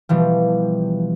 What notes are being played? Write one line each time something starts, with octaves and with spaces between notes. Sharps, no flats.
B2 E3 F3 G3